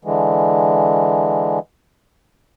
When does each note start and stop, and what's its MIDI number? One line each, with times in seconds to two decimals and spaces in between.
0.05 1.59 50
0.05 1.59 52
0.05 1.59 56